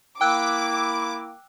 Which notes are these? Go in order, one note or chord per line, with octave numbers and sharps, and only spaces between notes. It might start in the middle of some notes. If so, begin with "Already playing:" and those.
A#3 E4 G5 D6 E6 F#6